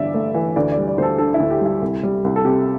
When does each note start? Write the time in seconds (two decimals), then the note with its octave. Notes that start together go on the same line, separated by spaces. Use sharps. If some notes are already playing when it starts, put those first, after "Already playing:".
Already playing: G1 G2 E3 D5 E5
0.14 A3
0.34 E3
0.56 D2 D5
0.72 D5
0.77 G3
0.87 D5
0.98 D2 C5
1.03 A4
1.18 D3 A4
1.34 E4
1.40 D2
1.51 G4
1.61 G3 E4
1.82 C2
2.03 G3
2.24 C2
2.36 A4
2.45 C3 G4